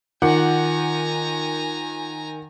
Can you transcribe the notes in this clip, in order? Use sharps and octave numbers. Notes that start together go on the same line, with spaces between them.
D#3 F4 F#5 G#5 A#5 D6